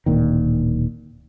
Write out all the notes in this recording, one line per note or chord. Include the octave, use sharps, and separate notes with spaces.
D1 A#2 D#3